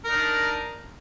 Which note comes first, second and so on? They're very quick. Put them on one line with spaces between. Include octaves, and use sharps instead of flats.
A#4 D#4 D4